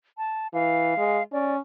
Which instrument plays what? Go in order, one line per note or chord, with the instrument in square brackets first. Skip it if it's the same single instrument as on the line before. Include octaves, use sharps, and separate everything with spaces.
[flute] A5
[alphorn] E3 [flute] F5
[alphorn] G#3
[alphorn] C#4 [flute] D5